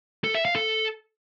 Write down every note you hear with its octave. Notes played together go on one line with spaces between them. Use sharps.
A4
E5
F5
A4